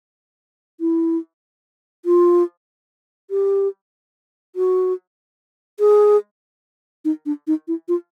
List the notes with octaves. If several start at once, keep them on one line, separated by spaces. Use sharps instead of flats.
E4
F4
G4
F#4
G#4
D#4
D4
D#4
E4
F4